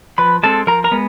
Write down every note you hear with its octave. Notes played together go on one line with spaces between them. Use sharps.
F3 B4 B5
G#3 C4 A4 A5
F3 A#4 A#5
A#4 A#5
G#3 B3